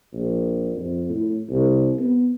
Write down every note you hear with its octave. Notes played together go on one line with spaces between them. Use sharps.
A#1
F2
A2
C2
B3